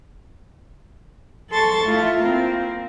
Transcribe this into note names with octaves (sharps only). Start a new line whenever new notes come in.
A4 A5 C6 C#6 A6
A3 E4 F4
A#3 C4